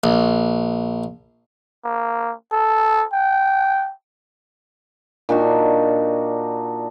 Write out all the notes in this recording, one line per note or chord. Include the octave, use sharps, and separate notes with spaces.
A#1
A#3
A4
G5
A#2 D4 D#4 F#4